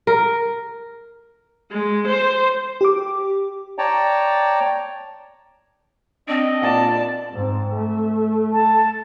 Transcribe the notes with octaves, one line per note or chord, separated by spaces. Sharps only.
A#4
G#3
C5
G4 D6
C#5 D5 G5 A5 A#5
C4 D4 D#5
A#2 D5 A5
G#2 C4
A3
A5